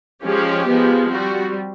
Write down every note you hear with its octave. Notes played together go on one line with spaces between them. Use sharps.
F3 G#3 C#4 G4
F3 G#3 B3
G3 C4 F#4